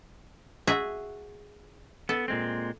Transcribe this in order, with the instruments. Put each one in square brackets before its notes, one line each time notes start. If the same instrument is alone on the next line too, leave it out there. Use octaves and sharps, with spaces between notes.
[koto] F#4 G#4 E5
[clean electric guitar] B3 [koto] A4
[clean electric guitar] A#2 G#3 C4